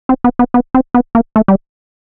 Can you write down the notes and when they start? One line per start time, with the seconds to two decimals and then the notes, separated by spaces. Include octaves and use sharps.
0.09 C4
0.24 B3
0.39 B3
0.54 B3
0.74 C4
0.94 B3
1.15 A#3
1.36 A3
1.48 G3